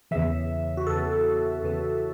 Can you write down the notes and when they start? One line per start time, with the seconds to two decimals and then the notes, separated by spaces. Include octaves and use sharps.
0.11 E2 C#3 E3 E5
0.77 F#4
0.87 E2 C#3 E3 A4
1.62 E2 C#3 E3